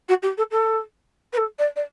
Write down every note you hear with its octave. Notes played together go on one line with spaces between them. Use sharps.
F#4
G4
A4
A4
B4
A4
D5
D5